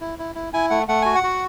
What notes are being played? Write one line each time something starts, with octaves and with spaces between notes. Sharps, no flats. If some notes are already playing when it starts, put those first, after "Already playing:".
E4
E4
E4
E4 G#5
A3 F#5
A3 F#5
F#4 G#5
F#5
F#4